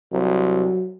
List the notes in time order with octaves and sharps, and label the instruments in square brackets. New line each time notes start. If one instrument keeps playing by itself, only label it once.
[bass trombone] C2 [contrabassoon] F#3